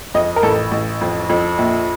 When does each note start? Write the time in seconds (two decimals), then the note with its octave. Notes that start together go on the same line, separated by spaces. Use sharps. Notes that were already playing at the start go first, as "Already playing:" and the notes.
0.14 F2 D#5
0.36 A#4
0.43 A1 A4
0.71 A1
1.01 F2
1.29 F2
1.58 A#1